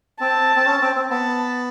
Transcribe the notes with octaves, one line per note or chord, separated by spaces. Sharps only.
C4 A5
C4
C#4
C4
C4
B3 A5